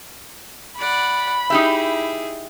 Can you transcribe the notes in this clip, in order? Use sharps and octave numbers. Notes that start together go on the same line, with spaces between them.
D5 F#5 B5
D#4 E4 G4 G#4 E5